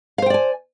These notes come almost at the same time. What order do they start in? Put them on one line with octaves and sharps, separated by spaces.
F5 C5 G5 D5 G#5